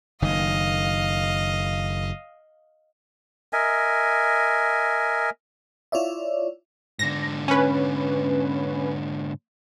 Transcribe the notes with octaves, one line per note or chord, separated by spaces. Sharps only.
F#1 D#3 D#5 F5
A#4 D#5 E5 G#5
E4 F4 C#5 D5 E5
G#2 D3 A#6
C#4 B4